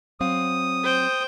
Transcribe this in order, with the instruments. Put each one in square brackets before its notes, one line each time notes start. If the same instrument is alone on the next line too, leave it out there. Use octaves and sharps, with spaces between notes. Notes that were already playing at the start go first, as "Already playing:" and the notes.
[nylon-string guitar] F#3 C4 F5 [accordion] D#6
[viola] C5 G5